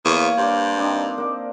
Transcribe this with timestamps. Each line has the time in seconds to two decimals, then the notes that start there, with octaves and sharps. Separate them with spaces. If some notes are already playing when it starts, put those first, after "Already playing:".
0.05 E2 A#3 C#5 F5
0.38 G2 C5 D5
0.77 C4 D4 D#4
1.18 A#3 D5